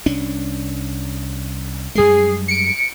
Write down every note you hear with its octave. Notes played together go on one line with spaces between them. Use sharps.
C2 C#4 D4
F#2 G3 G#3 G#4 C7
C#7 D7